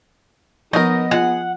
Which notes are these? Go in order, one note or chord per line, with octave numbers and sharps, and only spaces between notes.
F3 B3 D#4 A#4 D#5
F4 G#4 D#5 F#5